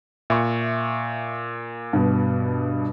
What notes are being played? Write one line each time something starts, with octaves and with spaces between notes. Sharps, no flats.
A#2 E5 C#6
G2 B2